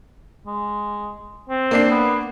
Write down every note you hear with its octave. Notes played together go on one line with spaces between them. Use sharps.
G#3
C4
A#3 D4 C7
B3